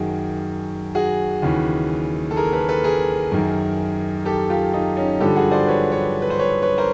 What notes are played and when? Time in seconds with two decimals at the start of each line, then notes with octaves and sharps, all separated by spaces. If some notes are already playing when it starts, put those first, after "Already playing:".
Already playing: F#2 D#3 F#4 G#4
0.95 F#4 G#4
1.42 D#2 C#3 E3
2.31 A4
2.36 G#4 A#4
2.52 A4 B4
2.69 A4 B4
2.84 G#4 A#4
3.32 F#2 D#3
4.25 G4 A4
4.50 F4 G4
4.74 D#4 F4
4.97 C#4 D#4
5.21 G2 D3 F3 G4 A4
5.36 F#4 G#4
5.52 C5 D5
5.67 B4 C#5
5.92 B4 C#5
6.22 B4
6.30 C5
6.39 B4 C#5
6.62 B4 C#5
6.78 A#4 C5